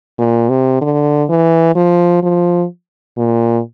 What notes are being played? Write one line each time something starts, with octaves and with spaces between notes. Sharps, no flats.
A#2
C3
D3
E3
F3
F3
A#2